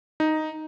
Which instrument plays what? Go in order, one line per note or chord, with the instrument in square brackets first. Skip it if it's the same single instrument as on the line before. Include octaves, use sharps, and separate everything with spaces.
[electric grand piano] D#4